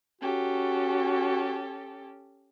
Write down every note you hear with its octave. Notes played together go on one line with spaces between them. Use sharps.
C#4 F#4 G4 A4